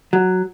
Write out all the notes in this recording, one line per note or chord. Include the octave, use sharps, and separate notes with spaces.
F#3